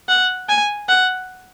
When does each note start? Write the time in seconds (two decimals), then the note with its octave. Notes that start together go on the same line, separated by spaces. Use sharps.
0.09 F#5
0.49 G#5
0.88 F#5